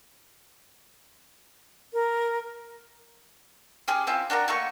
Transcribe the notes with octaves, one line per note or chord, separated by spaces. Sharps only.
A#4
C#4 G4 G#4
C4 C#4 E4 F4
D4 F#4 A#4 A#5
A3 A#3 F#4 C#6